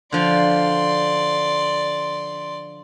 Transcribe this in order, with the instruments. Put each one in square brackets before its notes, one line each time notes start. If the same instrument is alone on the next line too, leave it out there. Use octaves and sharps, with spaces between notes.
[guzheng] D3 F3 [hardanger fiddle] D5 C6